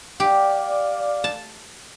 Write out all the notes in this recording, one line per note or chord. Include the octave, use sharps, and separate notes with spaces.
G4 D5 F5
A5